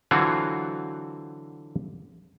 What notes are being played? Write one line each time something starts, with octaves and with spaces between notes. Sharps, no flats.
D3 E3 F#3 C4 F4 F#4